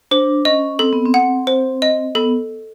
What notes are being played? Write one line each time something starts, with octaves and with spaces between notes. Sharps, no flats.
D4 C5
C#4 D#5
C4 A4
B3
C4
F#5
C5
D#5
B3 A4